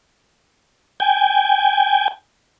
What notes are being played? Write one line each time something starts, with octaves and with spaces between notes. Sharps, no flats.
G5 G#5